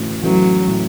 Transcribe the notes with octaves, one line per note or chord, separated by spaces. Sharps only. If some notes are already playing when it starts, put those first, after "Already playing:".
Already playing: A2 E3 C#4 F#4
E3 F#3 A3 C#4 F#4
A2